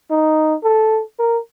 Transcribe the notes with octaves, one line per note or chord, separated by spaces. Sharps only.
D#4
A4
A#4